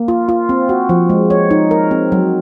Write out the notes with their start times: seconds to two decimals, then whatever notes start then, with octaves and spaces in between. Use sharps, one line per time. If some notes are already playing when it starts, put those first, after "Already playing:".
Already playing: A#3
0.08 F4
0.29 F4
0.49 C4
0.69 F#4
0.89 F3
1.09 G#3
1.30 C#5
1.51 D#4
1.71 A#4
1.91 C4
2.12 F#3